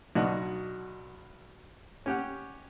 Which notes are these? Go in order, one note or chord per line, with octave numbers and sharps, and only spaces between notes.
B1 B2 D4 F#4 D#5
C#4 G4 F#5